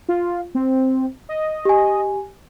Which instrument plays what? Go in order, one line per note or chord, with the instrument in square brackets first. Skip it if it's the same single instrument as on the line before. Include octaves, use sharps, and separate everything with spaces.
[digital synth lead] F4
C4
D#5
[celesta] G4 G#5